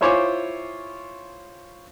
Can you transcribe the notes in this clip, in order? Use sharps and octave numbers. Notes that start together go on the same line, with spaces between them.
E4 F4 C5 C#5 G#5 D6